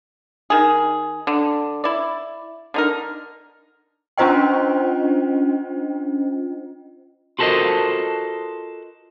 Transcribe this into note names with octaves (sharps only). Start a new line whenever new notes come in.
D#3 G#4
D3
E4 D5
D3 D#4 A#4
C#4 D4 F4 C5 D#5 G5
F4 F#4 A4 A#4 C5 D#5